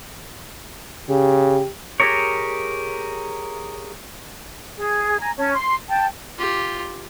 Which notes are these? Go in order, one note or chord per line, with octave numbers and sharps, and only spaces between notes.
C#3 G4
G4 G#4 A#4 C#5
G#4
G#5 A#5
C#4 A5
C6
G5 A5
F4 G4